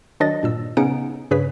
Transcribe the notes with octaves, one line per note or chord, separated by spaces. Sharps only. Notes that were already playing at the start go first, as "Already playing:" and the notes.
D#3 F#3 D4 D#5 A6 A#6
G2 A#2 E6
C#3 B3 C#4 D#4 F#5 D7
G2 C#3 G#4 B4 C#5 B6